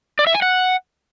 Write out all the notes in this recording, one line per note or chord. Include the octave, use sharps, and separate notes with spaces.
D5
E5
G#5
F#5